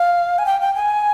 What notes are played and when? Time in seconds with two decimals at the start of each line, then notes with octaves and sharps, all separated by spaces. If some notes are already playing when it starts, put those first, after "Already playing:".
Already playing: F5
0.38 G#5
0.46 G5
0.61 G5
0.75 G#5